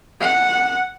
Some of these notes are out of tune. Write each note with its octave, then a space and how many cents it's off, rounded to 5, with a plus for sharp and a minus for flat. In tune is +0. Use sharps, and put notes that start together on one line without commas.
F#5 -5